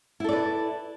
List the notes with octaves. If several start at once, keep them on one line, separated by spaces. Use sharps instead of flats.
E4 A4 B4 D5